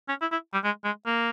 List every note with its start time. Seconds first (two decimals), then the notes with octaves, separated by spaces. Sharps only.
0.08 C#4
0.21 E4
0.32 E4
0.53 G3
0.64 G#3
0.84 G#3
1.06 A#3